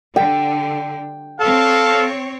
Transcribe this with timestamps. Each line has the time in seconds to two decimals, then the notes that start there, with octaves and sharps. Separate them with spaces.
0.16 D3 G5
1.40 C4 A4 C#5 F5